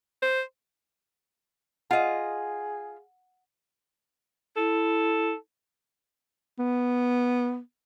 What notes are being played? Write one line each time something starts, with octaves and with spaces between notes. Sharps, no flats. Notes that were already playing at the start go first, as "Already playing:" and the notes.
C5
F4 G#4 D#5 F#5
E4 A4
B3